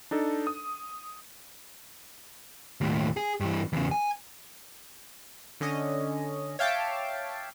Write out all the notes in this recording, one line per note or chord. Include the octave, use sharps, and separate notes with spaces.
D4 D#4 A4
D#6
D#2 A2
G#4
G2 E3
E2 C#3
G#5
D3 C#4 D#5
C#5 E5 F5 G5 A5 D6